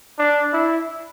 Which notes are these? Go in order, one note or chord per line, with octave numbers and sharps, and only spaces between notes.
D4
E4